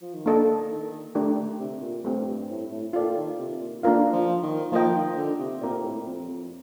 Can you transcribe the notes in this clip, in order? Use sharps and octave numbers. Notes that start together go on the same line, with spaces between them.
F3
D#3
D3 A#3 D4 A4 D#5
D#3
D3 A3 D4 G4 A#4 D5
D3
C3
A#2
G2 A3 C4 G4
G2
A2
A2
A#2 F4 A4 D5 G5
D#3
C3
A#2
D3 A#3 D4 F4 A#4 F5
F3
D#3
F3 A#3 F4 A#4 D#5 G5
D#3
D3
C3
A#2 C4 G4 A#4 D5
A2
F2
F2